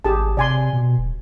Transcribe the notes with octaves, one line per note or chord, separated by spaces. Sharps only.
G#1 G4 G#4 A5
C3 D5 G#5 C6
B2
D#1